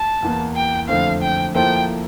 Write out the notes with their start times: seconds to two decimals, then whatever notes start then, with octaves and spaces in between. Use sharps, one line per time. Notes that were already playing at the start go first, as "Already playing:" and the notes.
Already playing: A5
0.22 E2 E3 A#3
0.56 G5
0.89 F2 D3 A3 C4 F5
1.22 G5
1.55 F3 A#3 E4 A4 C5 G5